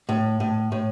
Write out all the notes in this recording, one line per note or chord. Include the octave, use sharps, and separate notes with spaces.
A2
A2
A2